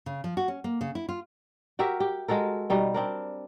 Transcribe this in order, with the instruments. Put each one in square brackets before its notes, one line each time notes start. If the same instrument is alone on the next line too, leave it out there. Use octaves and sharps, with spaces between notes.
[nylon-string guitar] C#3
F3
F#4
C#4
A#3
C#3
E4
F4
[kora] F#4 G4 A#4 E5
G4
G#3 F#4 A4 A#4
B2 G3 D#4
C4 D4 A#4